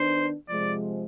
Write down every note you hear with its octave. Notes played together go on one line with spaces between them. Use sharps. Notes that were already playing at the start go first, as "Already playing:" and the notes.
Already playing: D#3 B3 D4 C5
C3 F3 G#3 D5